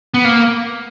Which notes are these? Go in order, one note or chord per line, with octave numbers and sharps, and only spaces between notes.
B3
A#3